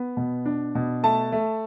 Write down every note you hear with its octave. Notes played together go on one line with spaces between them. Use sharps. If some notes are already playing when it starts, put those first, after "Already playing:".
Already playing: B3
B2
D4
B2
A3 A5
A3